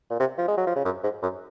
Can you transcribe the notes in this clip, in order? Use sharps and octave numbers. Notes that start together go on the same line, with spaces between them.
A#2
C3
F3
G#3
F#3
F3
C#3
F#2
G#2
F#2